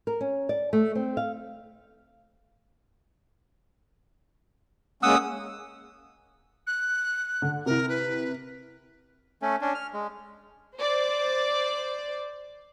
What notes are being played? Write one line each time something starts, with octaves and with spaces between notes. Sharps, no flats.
A#4
C#4
D5
A3
C4
F5
G#3 A#3 C#4 F#5 D#6 E6
F#6
D3
C3 E4 A#4
B4
A3 C#4
C#4 D4
F6
G#3
C5 D5